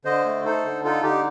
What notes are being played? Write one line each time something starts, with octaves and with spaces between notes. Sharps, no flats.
D3 C5 D#5
A3
D#4 A4 C5
D3
D#4 F4 A4
D3 D#4 G4